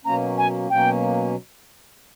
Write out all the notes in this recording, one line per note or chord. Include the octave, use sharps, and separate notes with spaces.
B2 F#3 A#3 C#4 A#5
G#5
B2 F#3 A#3 C#4 G5